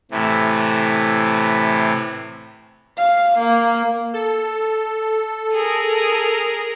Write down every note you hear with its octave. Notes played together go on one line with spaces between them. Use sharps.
A2 C3 E3
F5
A#3
A4
G#4 A#4